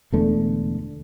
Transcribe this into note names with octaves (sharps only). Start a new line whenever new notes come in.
E1 E2 D3 A3